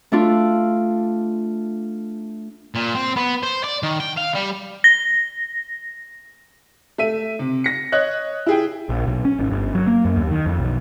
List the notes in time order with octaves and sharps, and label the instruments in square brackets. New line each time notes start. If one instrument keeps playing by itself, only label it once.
[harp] A3 D4 F4
[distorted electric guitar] A#2
C4
B3
C5
D5
D#3
G5
F5
G3
[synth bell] A#6
[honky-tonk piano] A3 E5 D#7
C3
A#6 C#7
C#5 D#5 F#6
E4 G#4 G5
[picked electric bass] A#1
B1
C#4
G#1
G1
F#3
A#3
F#2
D#2
D#3
F2
B1